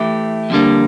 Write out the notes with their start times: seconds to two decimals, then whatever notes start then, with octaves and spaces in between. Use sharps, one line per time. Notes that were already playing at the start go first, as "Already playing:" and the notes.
Already playing: E3 A3 E4 G4
0.50 F2 D3 G3 A#3